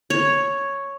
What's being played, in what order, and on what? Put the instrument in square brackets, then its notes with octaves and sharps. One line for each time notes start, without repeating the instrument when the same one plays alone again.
[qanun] C#5